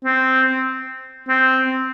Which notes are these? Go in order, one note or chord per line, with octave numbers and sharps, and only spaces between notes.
C4
C4